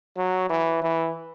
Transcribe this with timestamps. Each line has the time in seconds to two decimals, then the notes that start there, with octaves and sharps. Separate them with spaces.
0.17 F#3
0.50 E3
0.82 E3